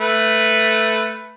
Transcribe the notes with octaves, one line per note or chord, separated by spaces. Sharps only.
A3 B4